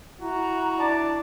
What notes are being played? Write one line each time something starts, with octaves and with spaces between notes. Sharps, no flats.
E4 F#4 A#5
D4 D5 A5